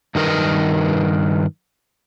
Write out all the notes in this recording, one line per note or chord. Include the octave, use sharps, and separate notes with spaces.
G2 D#3 D#4 A#4 B4 D#5